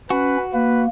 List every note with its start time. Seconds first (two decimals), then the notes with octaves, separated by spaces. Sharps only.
0.10 C#4 F#4 B4
0.54 A#3 B4